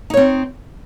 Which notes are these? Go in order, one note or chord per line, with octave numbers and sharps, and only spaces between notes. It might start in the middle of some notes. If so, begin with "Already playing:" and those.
C4 D#4 C#5